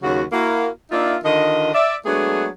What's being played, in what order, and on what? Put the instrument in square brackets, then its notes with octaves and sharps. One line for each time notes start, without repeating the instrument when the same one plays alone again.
[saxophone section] D#2 C#3 F#3 F#4
A#3 E4 F#4
A#3 D4 D#4 F4 E5
D3 D#3 F4 D#5
D5 E5
F#3 G#3 A3 B3 D4 G#4